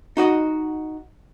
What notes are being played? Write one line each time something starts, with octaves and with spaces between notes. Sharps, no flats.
D#4 F#4 D#5